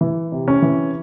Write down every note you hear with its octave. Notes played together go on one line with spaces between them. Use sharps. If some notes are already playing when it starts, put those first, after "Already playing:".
E3
C3
C#4
E3